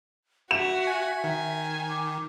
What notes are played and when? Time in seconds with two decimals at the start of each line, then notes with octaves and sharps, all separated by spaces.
0.51 F#4 E5 F#5 E7
0.87 G#5
1.24 D#3 G#5
1.90 D6